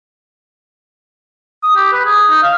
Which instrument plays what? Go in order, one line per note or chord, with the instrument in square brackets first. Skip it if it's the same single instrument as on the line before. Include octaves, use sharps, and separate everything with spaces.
[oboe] D#6
G4
B4
G#4
D#4
F5